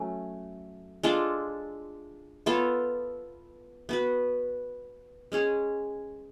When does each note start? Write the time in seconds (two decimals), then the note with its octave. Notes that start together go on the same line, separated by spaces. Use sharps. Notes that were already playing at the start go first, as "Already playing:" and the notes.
Already playing: F#3 A3 C#4
1.03 G#3 D4 F4 A4
2.46 B3 F4 A4 C#5
3.89 B3 F#4 B4
5.32 G#3 C#4 G#4 C#5